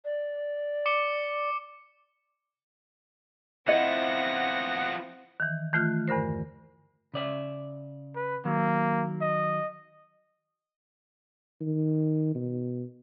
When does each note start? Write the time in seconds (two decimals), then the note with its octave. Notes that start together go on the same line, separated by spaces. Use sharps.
0.05 D5
0.86 D6 C#7 G7
3.68 F3 B3 C4 E4 D#5 F#5 A#6
5.40 D#3 E3
5.73 D#3 E3 A3 F4 F6 F#6
6.08 E2 G2 D3 A#4 C5
7.14 C#3 D5 E5
8.15 B4
8.45 D#3 F#3 A#3
9.21 D#5
11.61 D#3
12.35 B2